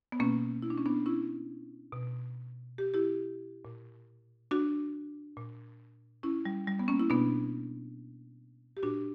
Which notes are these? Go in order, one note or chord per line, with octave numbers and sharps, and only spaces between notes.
B3
B2 A#3 C#4
E4
D4
C#4
B3 D4
C#4 E4
B2
G4
E4 G4
A#2
D4 F#4
A#2
C#4 E4
G3
G3
B3
A#3 C#4
E4
B2 B3 D4
G4
A#2 D4 F#4